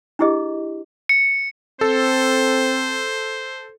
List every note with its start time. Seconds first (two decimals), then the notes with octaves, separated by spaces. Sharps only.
0.19 D4 E4 G4 G#4 D#5
1.09 C#7
1.81 C4 A4 C5